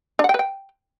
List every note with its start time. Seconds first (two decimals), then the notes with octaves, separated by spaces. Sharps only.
0.19 D4
0.24 F#5
0.29 G5
0.34 B4
0.39 G5